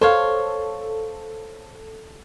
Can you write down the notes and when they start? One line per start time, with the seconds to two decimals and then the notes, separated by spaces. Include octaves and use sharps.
0.01 A4 C5 C#5 F5